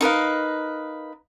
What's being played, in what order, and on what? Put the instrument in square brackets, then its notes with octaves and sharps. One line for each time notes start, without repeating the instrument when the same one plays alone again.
[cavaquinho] D#4 A#4 B4 F5